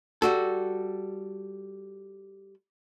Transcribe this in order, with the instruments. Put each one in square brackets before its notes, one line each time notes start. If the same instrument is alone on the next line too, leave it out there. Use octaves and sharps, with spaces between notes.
[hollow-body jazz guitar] G3 F#4 A4